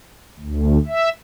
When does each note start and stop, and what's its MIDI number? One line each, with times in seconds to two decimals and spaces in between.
0.39 0.78 38
0.87 1.09 76